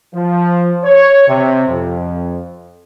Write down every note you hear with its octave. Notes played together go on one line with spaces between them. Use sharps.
F3
C#5
C3
F2